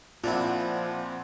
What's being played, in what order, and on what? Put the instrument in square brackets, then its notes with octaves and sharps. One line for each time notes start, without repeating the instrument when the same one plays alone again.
[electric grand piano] A#2 C4 F#5 [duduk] F3 [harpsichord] D4 E4 [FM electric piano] F4